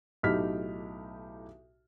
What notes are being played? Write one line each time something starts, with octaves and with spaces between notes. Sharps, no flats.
B1 A2 D#4 G4 F6 B6